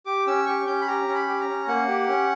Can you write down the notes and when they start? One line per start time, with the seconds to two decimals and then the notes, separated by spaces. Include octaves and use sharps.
0.06 G4 D6
0.27 C#4 E6
0.46 G4 C#6
0.66 C#4 G6
0.81 B5
0.87 G4 A#5
1.08 C#4
1.14 B5
1.27 G4
1.41 A#5
1.48 C#4
1.68 A#3 F#5
1.88 G4
2.09 C#4